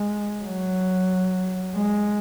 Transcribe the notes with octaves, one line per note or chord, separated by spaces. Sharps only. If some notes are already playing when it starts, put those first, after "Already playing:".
Already playing: G#3
F#3
G#3